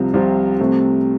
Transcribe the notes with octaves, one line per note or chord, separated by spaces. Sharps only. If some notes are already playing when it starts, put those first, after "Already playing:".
Already playing: C2 C3 F3 C4 F4
C2 C3 F3 C4 F4
C2 C3 A3 C4